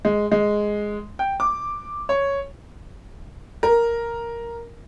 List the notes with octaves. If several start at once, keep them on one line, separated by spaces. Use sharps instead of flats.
G#3
G#3
G5
D6
C#5
A#4